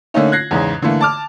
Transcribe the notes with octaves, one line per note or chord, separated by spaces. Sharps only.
D3 A3 A#3 C#4 D#4
F#6 G#6 A#6 C7
E2 G#2 C#3
D3 E3 A3 A#3
A5 D6 F6